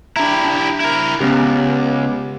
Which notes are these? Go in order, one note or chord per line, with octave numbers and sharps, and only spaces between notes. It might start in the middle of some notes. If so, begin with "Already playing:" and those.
D4 E4 G4 A#5
D4
E4 A#4
C#2 B3 C#4 G4